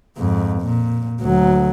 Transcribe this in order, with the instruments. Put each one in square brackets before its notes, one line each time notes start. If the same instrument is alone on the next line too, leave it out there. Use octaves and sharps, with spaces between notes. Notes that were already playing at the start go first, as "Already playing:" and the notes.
[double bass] F2 G#2
A#2
D2 F#3